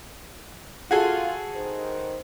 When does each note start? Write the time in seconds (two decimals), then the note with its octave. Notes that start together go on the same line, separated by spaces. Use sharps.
0.91 F4 F#4 G#4 A4
1.56 D#3 C5